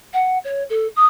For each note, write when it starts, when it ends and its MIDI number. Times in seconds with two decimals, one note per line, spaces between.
0.13 0.38 78
0.44 0.63 73
0.70 0.87 69
0.96 1.05 87